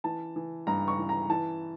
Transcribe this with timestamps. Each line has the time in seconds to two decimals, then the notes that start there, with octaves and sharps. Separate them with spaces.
0.04 E3 A5
0.36 E3
0.67 G2 A#5
0.88 C#6
0.99 E3
1.09 A#5
1.30 E3 A5